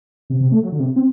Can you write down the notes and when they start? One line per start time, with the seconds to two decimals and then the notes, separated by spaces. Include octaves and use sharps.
0.30 C3
0.40 C3
0.52 A3
0.63 F#3
0.72 D3
0.79 C3
0.96 C4